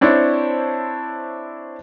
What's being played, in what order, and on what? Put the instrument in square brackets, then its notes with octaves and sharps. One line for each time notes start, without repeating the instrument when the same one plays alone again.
[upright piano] C4 D4 E4 C5 C#5